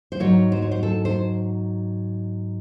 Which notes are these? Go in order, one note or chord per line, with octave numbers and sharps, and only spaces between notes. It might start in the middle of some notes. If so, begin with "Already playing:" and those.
C5
G#2 F#3 C#5
C5
C#5
C5
A4
C5